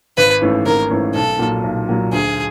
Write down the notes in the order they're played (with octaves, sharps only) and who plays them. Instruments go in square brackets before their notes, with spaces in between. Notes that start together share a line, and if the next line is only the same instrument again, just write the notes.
[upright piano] G#1 [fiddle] B4
[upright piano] G#2 E3 A3 C#4
[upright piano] G#1 [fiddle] A#4
[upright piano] G#2 E3 A3 C#4
[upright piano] B1 [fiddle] A4
[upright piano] A#2 F#3
B1
A#2 F#3
[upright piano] D2 [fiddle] G#4